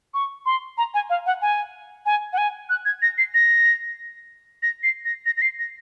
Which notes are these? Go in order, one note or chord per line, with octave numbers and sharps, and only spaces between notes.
C#6
C6
A#5
G#5
F5
F#5
G#5
G#5
F#5
G#5
F#6
G#6
A#6
C7
A#6
A#6
C7
A#6
A#6
A#6
C7
A#6